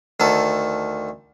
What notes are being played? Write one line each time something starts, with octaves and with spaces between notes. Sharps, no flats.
D2 D#3 A4